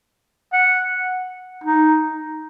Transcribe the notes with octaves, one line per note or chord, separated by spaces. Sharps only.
F#5
D#4